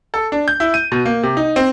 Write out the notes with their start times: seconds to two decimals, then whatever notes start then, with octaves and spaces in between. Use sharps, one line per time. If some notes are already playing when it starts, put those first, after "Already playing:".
0.14 A4
0.32 D4
0.48 G6
0.60 E4
0.74 D#7
0.92 B2
1.06 A#3
1.23 C3
1.37 D#4
1.56 C4